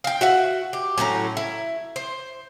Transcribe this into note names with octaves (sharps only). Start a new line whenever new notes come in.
F5 G5
F#4 E5 F#5
G4
A2 F#3 C#4 A#5
E4
C5